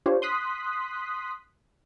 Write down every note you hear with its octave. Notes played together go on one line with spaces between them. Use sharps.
D4 F4 G4 C5 C#5
C6 D#6 F#6 B6